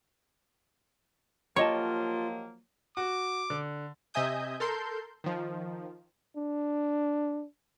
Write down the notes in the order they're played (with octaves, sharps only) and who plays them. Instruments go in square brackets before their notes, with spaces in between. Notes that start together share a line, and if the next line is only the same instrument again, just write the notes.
[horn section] F3 F#3 A#3 [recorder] F4 [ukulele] G4 D#5 A5 [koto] C#5
[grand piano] F#4 [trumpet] D6
[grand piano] D3
[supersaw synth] C3 D#5 E5 G#5 D#6 G6
A4 A#4 C6 G6
D#3 F3
[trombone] D4